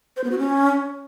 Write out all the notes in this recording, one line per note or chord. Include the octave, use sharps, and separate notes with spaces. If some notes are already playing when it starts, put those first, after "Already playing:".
C5
B3
F#4
C#4